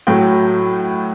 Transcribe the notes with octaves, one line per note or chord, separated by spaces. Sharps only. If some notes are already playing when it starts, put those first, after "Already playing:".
A2 F#3 A3 G5